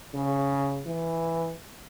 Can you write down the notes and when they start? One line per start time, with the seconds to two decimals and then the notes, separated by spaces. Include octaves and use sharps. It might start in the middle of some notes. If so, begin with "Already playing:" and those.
0.14 C#3
0.86 E3